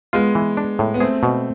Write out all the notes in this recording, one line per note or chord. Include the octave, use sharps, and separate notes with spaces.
G#3 B3 F4
E3
D4
A2
B3
A3 C4 G#4
B2